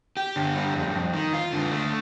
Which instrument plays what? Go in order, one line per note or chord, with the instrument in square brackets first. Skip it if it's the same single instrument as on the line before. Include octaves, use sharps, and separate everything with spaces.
[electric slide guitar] G4
D3
G3
F2
F2
D#3
F4
D3
A3